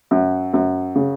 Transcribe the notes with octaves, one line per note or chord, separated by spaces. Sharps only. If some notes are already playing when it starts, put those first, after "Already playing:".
F#2
F#2
C#3